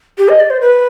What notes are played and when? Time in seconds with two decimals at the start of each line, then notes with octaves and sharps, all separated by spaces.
0.18 G4
0.28 D#5
0.39 D5
0.50 C5
0.61 B4